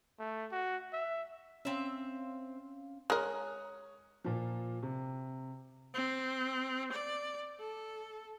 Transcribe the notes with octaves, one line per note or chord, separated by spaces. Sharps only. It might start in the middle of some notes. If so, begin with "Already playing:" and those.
A3
F#4
E5
C4 C#4 E5 F5
G#3 A#4 C#5 D#6 F#6
A#2 F3
C3
C4
D5
A4